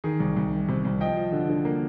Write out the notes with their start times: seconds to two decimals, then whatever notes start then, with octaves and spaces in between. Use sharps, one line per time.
0.04 D#3 G#4
0.20 C2
0.36 C2
0.52 D#3
0.69 C3
0.85 C2
1.01 F3 D#5 G5
1.16 F3
1.32 D3
1.49 D3
1.65 A#3